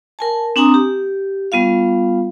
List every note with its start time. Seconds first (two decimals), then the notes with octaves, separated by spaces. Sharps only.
0.19 A#4 G#5 A5
0.56 C4 D4 G#5 A#5 D#6
0.74 G4
1.52 G3 B3 F4 F5